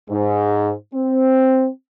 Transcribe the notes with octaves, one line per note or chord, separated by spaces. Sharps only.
G#2
C4